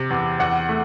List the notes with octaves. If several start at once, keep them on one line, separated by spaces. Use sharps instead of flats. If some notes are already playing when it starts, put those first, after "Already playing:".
Already playing: C3
E2
E2 F#5
A3